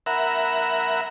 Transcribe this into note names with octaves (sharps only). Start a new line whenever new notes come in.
A#4 E5 F#5 B5